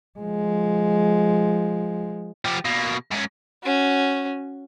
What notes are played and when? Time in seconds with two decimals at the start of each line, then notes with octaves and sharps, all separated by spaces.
0.19 F3 G#3
2.45 F3 G4
2.65 B2 A#3
3.11 G#2 C#4
3.63 C#4 F#4